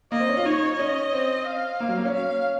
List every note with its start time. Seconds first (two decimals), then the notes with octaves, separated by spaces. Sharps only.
0.12 A#3 D#5
0.20 C4
0.29 C#4
0.37 F4
0.45 D#4 C#5
0.79 C#4 D#5
1.13 C4
1.47 F5
1.80 A#3
1.89 F#3
1.97 A#3
2.05 C#4
2.14 F5